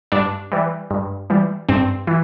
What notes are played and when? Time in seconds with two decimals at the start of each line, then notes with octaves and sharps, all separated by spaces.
0.12 G2 D4
0.52 E3 G3
0.90 G2
1.30 E3 G3
1.69 G2 C4
2.07 E3